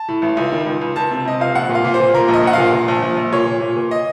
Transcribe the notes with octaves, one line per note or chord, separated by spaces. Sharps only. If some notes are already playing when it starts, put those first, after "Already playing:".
Already playing: A5
A2
A1
C#2
D#3
C#2
C#2
C#2 A5
C3
C3 D#5
C#2 F5
A#1 F#5
A#2
F5
A#2
C5
A#2
A#2 A#4
A#1
D#5
A#1 F#5
A#2 F5
A#2
A#1
A#1
A#1
A#2 C#5
A#2
A#2
A#2
D#5